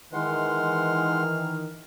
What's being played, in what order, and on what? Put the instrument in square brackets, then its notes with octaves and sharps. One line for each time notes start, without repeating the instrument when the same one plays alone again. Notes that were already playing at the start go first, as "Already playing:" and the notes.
[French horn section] D#3 E3 [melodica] G#3 F#5 C6 [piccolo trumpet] F6